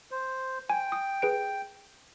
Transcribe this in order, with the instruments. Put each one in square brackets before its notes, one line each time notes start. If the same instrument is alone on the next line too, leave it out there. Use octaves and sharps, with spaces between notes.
[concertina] C5
[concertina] G5 [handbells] G#5
[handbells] D#6
G#4 B4 D7